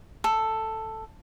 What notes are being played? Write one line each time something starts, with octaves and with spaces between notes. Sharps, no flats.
A4